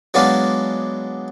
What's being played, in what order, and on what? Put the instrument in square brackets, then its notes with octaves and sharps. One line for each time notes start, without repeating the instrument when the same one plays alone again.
[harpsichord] F#3 G#3 B3 D4 D5 F5